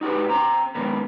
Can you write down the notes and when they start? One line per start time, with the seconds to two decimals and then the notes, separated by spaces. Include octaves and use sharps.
0.01 D#4 F#4 G4 B4
0.29 C4 C5 A#5
0.75 G#2 D#3 A#3 B3